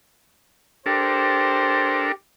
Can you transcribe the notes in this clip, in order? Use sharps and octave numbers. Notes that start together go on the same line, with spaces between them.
D4 G4 A4 A#4 C5